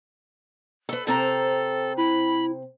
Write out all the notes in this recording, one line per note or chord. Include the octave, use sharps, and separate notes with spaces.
A4 B4
C3 C4 A4 A#5
E4 B5